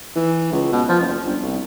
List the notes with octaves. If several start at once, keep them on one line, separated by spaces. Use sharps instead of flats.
E3
C#2
B2
F3
F#1
G1
C2